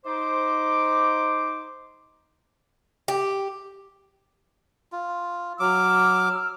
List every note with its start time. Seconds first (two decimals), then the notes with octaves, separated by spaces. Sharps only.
0.05 D#4 C5 D6
3.08 G4
4.92 F4
5.60 F#3 D6 E6 F6